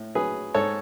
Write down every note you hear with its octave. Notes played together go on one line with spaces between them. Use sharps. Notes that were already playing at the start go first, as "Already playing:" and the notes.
Already playing: A2
F#3 G#4 B4
G#2 A4 C#5